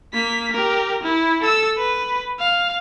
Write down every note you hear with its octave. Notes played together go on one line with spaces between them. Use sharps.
A#3 B6
G4 A#4
E4
A4 E6
B4
F5